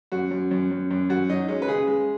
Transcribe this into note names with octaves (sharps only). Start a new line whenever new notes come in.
F#2 F#4
F#2
F#2
F#2
F#2
F#2 F#4
F#3 D#4
G#3 C#4
B4
C#3 G#4
G#3